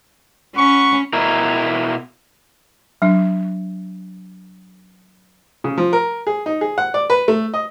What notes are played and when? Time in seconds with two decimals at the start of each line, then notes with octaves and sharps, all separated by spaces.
0.56 C#4 F#5 B5 C#6
1.13 B2 E4 A#4
3.02 F#3 D4
5.64 C#3
5.78 F3
5.93 A#4
6.27 G#4
6.46 D#4
6.61 G#4
6.78 F#5
6.94 D5
7.10 B4
7.28 A3
7.54 D#5